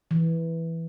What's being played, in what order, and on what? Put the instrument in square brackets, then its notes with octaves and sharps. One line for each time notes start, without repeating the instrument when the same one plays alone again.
[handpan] E3